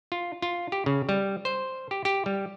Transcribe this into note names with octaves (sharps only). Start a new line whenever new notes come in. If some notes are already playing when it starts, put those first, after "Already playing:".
F4
F4
G4
C#3
G3
C5
G4
G4
G3